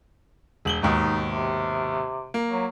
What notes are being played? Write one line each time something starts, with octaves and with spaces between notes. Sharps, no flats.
E1 F#7 G7
D#2 G#2 B2 D#4
C3
A#3
F#3